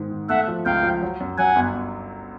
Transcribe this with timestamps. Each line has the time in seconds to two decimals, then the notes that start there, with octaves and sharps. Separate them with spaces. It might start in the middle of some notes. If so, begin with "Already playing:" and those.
Already playing: G#2 D#3 G#3
0.12 D#3
0.29 A3 E5 F#5
0.48 F3
0.66 C#2 F5 G5
0.83 F3
1.02 F#3
1.20 F#2
1.38 F#3 F#5 G#5
1.56 G1